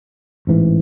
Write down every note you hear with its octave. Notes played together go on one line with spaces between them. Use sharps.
A1 G#2 E3